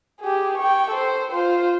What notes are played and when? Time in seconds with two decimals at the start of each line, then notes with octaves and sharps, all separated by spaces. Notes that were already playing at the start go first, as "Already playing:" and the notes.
0.21 G4 G#4
0.58 G5 C#6
0.91 A4 C5
1.32 F4 C5